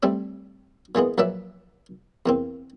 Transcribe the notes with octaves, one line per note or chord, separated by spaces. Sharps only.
G3 A3 C4 D5
A#2 E3 G#3 B3
A#1 F#3 B4 D5 E5
E2 A#3 C4